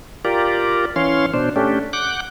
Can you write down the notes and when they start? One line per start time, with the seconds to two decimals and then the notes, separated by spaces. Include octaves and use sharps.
0.25 F4 G4 A#4 D5
0.96 E3 C#4 C#5 F5 C6
1.34 B2 D4 C5
1.56 A3 C#4 D4 G4
1.93 F#5 D6 F#6 G6